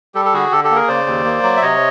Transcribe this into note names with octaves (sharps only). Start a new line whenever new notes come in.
G3 G4 A4
A4
D3 F#4 G#4
D3 G4 A4
G4 A4
A#3
G#4 A#4
C#3 C5 D5
D#2
A#3
F#3
E5
C3 C#5 D#5